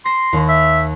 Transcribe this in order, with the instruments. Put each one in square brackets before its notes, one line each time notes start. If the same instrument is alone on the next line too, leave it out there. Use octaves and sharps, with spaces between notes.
[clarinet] C6 [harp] A#6 E7
[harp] D#2
[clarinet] E5